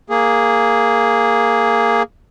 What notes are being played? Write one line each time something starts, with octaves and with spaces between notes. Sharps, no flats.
A#3 G#4